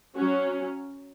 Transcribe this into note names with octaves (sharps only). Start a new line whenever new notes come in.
F#3 C#4 F#4